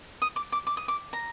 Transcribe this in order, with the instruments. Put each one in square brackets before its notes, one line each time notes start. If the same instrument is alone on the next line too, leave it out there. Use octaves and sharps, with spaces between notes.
[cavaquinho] D#6
D6
D6
D6
D#6
D6
A#5